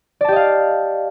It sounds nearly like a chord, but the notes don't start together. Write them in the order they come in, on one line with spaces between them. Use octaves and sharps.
D5 A5 G4 D#5 F5